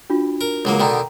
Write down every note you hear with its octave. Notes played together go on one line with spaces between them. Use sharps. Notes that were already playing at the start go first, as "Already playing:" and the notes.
D4 F4 F#4
A#4
C#2 F#3 A#3
B2 D3 D#3 G5 A#5